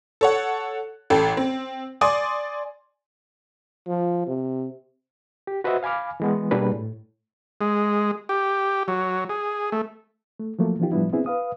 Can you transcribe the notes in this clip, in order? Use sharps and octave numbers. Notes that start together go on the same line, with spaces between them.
A4 C#5 F#5
A1 A4 G5
C4
D5 G#5 C6 D6 D#6
F3
C3
G4
F#4 B4 C5 D#5 E5 F#5
F5 G#5 B5 D6 F6
E3 G#3 B3
B2 G3 A#3 D4 G#4 B4
A2
G#3
G4
F#3
G#4
A3
A3
F3 F#3 A3 A#3
E3 F3 B3 D#4 F4 G4
A2 F3 G3 B3 D4 E4
B3 C4 D4 E4 G#4
B4 F5 D#6